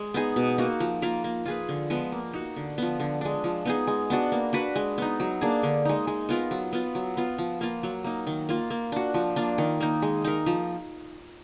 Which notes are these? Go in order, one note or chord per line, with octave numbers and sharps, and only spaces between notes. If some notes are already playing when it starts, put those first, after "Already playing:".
Already playing: G#3
B3 D#4 G#4
B2
A#3 D#4 F#4
F3
A#3 F4 A#4
A#3
F4 G#4 B4
D3
F3 G#3 B3
A#3
D#4 F#4
D3
F3 B3
D3
G#3 D4
F3
B3 D#4 G#4
G#3
B3 D4 F#4
A#3
D4 F#4 B4
G#3
B3 D#4
F#3
A#3 D4 G#4
D3
G#3 D#4
G#3
B3 F4 A#4
F#3
B3 F4
F#3
B3 F4
F3
A#3 F4
F#3
A#3 D#4
D#3
A#3 F4
A#3
D4 F#4
F3
A#3 D4 F4
D#3
A#3 D#4
G#3
D#4 A#4
F3